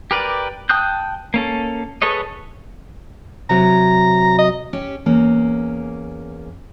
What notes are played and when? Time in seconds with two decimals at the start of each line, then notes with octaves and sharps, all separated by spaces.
0.11 G4 A#4 B4 D5
0.69 G5 A5 D#6 F#6 G6
1.34 A#3 C#4 A4
2.02 G#4 A4 B4 C#5 D#5
3.49 C3 F#3 A#5
4.38 D#5
4.73 C#4 G4
5.06 E2 A#3 C#4